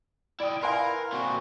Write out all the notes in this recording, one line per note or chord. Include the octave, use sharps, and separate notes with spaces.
E4 D5 G5 D#6
E4 A#4 B4 F5 G#5 C6
A#2 C4 F#4